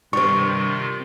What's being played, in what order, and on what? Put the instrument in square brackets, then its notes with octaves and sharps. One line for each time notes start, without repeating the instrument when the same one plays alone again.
[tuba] G2 [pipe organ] C3 D#3 F4 [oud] G3 C4 [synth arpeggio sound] C#6